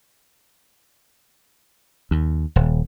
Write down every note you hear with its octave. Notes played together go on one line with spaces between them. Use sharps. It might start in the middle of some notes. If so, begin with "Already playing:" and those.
D#2
D#1